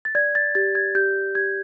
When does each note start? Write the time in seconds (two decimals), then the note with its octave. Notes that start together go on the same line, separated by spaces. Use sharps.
0.05 A6
0.15 D5 G#6
0.35 A6
0.55 G4 A6
0.75 G#6
0.95 G4 G6
1.35 G4 G#6